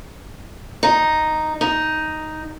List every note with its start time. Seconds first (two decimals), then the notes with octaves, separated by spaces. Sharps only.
0.83 D#4
1.61 D#4